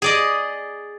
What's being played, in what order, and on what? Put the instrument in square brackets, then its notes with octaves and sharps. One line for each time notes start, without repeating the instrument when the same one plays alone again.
[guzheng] G#4 D5 D#5